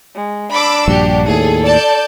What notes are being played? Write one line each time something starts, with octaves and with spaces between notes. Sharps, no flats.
G#3
D4 B5 D6 E6
A#1 G2 F#4 G4
D#2 A2 G#4 A4
D5 A5 G6